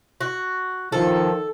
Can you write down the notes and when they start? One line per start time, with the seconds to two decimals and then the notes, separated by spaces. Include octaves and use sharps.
0.21 F#4
0.92 D#3 F3 A4